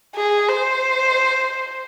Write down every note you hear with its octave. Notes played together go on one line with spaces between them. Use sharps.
G#4
C5